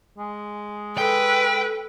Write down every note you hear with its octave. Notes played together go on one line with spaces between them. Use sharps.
G#3
A4 B4 G5